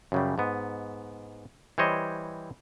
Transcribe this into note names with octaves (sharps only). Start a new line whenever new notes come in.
F#2 C#3 G3
G#2 B3
E3 G3 C5 C#5 D#5